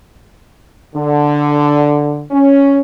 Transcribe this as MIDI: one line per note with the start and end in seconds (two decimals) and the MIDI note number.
0.95 2.23 50
2.31 2.81 61